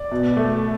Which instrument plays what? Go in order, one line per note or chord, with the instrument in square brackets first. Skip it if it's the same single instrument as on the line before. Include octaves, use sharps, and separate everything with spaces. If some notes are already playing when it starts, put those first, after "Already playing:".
Already playing: [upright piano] D5
B2
A3